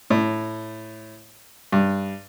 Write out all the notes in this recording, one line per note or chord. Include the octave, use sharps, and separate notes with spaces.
A2
G2